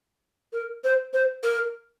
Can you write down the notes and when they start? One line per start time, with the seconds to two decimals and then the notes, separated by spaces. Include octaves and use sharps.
0.53 A#4
0.84 C5
1.13 C5
1.43 A#4